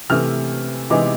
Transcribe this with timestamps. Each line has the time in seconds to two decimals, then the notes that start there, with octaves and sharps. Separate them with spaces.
0.10 C3 E3 A3 F6
0.90 C3 E3 G#3 B3 D#4 D6